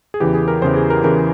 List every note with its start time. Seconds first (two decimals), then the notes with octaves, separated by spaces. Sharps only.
0.14 G#4
0.20 E2 C#3 E3 G4
0.35 G#4
0.48 A#4
0.62 E2 C#3 E3 C5
0.76 G#4
0.90 A#4
1.03 E2 C#3 E3 A#4